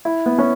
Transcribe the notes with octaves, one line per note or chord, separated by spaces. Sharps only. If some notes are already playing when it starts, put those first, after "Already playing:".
E4
B3
C#4